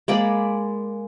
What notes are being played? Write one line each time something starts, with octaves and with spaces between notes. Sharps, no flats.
G#3 A#3 D5 B5